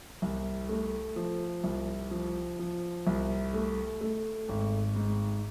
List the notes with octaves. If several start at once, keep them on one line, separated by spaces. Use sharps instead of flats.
C2
A3
F3
C2
F3
F3
C2
A3
A3
G#1
G#2